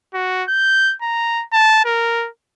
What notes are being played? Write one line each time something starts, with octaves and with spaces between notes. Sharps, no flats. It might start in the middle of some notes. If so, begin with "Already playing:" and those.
F#4
G6
A#5
A5
A#4